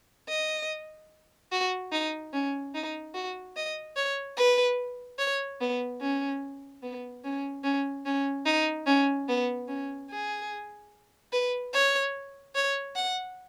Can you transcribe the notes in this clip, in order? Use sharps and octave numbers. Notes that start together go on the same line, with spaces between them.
D#5
F#4
D#4
C#4
D#4
F#4
D#5
C#5
B4
C#5
B3
C#4
B3
C#4
C#4
C#4
D#4
C#4
B3
C#4
G#4
B4
C#5
C#5
F#5